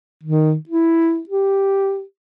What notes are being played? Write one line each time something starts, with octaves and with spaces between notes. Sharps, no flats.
D#3
E4
G4